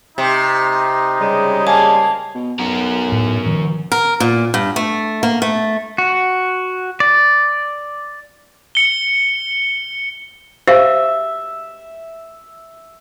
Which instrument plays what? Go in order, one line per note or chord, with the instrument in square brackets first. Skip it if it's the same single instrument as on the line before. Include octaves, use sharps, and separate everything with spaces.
[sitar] C3 [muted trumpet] D#4
[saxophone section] C#3 G3 G#3
[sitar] A#3 [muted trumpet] G#5 [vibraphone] A5
[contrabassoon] B2
[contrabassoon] B1 [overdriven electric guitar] F#4 A#4
[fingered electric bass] A2
D#3 F3
[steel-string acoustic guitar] A#4
A#2
G2
A3
A#3
A3
[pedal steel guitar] F#4
D5
[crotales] C#7 G7
[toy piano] G4 F5 [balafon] C5 [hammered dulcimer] E5